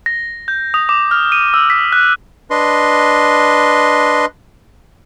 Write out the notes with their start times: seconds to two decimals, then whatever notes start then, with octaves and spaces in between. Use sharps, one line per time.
0.06 A#6
0.48 G6
0.74 D#6
0.89 D6
1.11 F6
1.32 D#7
1.54 E6
1.70 B6
1.92 F#6
2.51 D4 B4 D#5 C6